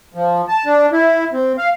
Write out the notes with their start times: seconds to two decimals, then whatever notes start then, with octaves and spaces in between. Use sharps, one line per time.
0.15 F3
0.48 A5
0.66 D4
0.92 E4
1.33 C4
1.58 F5